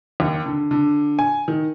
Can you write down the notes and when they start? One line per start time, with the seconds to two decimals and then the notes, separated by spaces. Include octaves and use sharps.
0.20 D#2
0.46 D3
0.71 D3
1.19 G#5
1.48 D#3